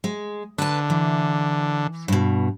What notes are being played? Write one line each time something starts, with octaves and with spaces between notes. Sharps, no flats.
G#3
D3 B4 A5
E3
G2 B2